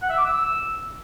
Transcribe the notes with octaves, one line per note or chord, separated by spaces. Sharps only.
F#5
E5
D6
E6